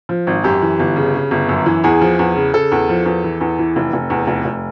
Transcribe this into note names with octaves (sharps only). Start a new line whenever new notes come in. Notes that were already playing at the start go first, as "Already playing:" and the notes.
F3
G#1
F#2 G4
E3
G1
C#3
C#3
G1
F#2
E3
E2 G#4
F3
E2
C#3
C#3 A4
E2
F3
E2
E3
E2
E3
F1
F1
E2
F1
F1